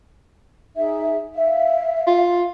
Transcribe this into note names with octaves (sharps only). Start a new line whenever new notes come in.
D#4 G#4 E5
E5 F5
F4